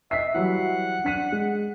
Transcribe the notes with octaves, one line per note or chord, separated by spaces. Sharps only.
D#5 E5 B6 C7
E3 F#3 G3 F#5
D4 B6 D#7
G#3